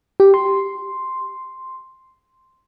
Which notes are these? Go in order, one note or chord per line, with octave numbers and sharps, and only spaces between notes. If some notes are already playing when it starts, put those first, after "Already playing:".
G4
C6